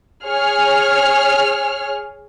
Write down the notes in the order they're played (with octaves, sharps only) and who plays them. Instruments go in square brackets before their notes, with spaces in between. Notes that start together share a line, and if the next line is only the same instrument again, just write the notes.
[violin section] G#4 C#5 F6